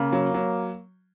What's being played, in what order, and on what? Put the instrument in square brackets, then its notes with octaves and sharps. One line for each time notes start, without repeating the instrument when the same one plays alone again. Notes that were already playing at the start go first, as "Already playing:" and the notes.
Already playing: [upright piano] C#3 [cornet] A#3
[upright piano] F#3
F#3